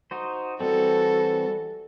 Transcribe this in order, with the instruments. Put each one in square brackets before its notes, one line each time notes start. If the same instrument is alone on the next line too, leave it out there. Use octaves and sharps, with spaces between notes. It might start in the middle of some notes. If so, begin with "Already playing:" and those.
[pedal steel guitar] D#4 F#4 C5
[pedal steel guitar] E3 G3 C4 [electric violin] F#4 A4